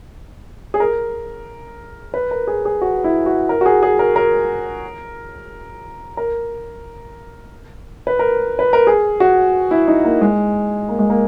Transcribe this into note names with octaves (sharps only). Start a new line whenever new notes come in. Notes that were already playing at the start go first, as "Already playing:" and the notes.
G#4
A#4
B4
A#4
G#4
G#4
F#4
E4
F#4
A#4
F#4
G#4
G#4
A#4
A#4
A#4
B4
A#4
B4
A#4
G#4
F#4
E4
D#4
A#3
G#3
A#3
G#3
A#3